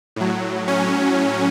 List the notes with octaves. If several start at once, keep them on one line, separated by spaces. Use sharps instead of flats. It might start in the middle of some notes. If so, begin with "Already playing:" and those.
A2 F#3
C#4